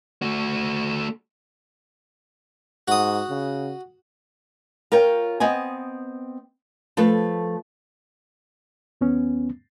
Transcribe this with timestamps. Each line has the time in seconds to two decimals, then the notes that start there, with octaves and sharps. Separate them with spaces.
0.22 A3 F#4
2.88 G#2 F#4 D#6
3.29 C#3
4.92 F4 A#4 C#5 G5
5.40 B3 C4 D#5 G#5
6.97 F3 A3 A4 B4
9.01 D#2 B3 C#4